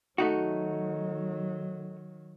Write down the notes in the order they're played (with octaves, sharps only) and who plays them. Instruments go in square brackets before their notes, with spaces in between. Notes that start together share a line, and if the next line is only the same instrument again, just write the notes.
[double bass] D#3 F#3 [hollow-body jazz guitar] A3 D#4 F#4